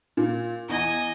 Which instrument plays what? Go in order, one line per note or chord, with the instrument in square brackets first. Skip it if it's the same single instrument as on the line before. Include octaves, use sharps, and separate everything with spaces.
[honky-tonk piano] A#2
[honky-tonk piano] E2 [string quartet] D#5 G#5